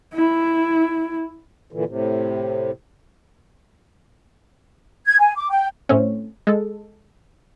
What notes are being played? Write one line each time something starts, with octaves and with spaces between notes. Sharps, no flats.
E4
A#2 D3 E3
A2 C3
G#6
G#5
D6
G5
A2 A3 C4 C#4
G#3 A4